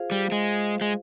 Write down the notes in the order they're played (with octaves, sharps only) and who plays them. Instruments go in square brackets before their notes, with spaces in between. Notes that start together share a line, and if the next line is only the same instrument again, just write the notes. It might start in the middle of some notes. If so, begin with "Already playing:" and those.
Already playing: [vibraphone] F4 G#4 C5 F5
[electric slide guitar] G3
G#3
G#3